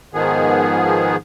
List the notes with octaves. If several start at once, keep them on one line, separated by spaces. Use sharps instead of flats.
G#2 D#3 F3 B3 G#4